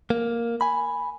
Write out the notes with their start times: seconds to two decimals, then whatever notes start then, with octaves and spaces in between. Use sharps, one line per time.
0.10 A#3
0.61 G#5 B5